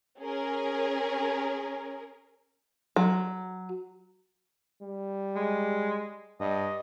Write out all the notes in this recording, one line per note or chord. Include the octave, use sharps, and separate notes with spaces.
C#4 G#4 A#4
F#3
G3
G#3
G2 D#5